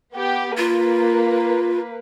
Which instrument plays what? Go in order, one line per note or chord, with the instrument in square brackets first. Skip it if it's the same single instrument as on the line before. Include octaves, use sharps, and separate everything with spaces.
[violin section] B3 G4
[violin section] A#3 B4 [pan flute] F4